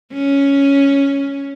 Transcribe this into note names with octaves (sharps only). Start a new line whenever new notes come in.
C#4